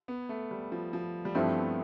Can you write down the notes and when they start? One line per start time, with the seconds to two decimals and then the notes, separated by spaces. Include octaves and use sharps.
0.08 B3
0.29 A3
0.51 G3
0.72 F3
0.93 F3
1.25 G3
1.35 G2 F3 A3 C4 E4
1.57 B3